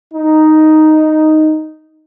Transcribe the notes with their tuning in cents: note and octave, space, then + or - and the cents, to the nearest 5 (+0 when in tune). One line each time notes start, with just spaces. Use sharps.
D#4 +0